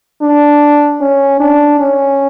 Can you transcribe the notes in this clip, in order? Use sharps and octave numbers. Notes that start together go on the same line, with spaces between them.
D4
C#4
D4
C#4